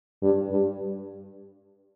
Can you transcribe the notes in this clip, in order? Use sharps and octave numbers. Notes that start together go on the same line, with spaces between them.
G2
G2